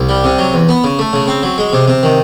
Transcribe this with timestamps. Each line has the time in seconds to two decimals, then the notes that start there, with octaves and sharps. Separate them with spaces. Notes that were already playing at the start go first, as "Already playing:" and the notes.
Already playing: C2
0.09 G3
0.24 C3
0.39 F#3
0.54 E2
0.69 B3
0.84 C#3
0.99 A3
1.13 C#3
1.28 C4
1.43 F#3
1.58 G#3
1.73 C3
1.88 C3
2.03 D#3